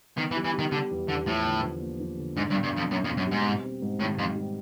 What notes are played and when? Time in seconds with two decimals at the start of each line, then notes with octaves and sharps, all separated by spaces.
0.17 D#3 B3
0.31 E3
0.36 G3
0.45 E3
0.54 G3
0.59 D#3
0.72 D3 G3
0.91 E2
1.08 E2 D3
1.27 A2 F3
1.45 D3
1.63 F3
1.81 A#3
2.00 F3
2.17 D3
2.36 G#2 D4
2.50 G2
2.55 B2
2.63 G2
2.72 F2 D4
2.91 F#2 A#3
3.04 F2
3.09 B2
3.17 F#2
3.27 G#2 G3
3.46 C4
3.63 C4
3.82 G#2
4.00 A2 D#3
4.18 F2 D#3
4.36 G3